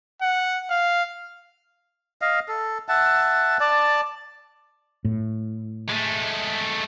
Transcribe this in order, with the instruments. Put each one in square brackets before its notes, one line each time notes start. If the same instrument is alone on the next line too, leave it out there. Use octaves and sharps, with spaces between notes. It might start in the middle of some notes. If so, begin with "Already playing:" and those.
[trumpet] F#5
F5
[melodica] D#5 F5
A4
E5 F#5 A5
D5 A5
[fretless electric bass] A2
[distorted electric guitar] G#3 A3